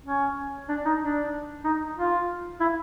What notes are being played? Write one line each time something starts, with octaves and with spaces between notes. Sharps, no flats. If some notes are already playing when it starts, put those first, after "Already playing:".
C#4
D4
D#4
D4
D#4
F4
E4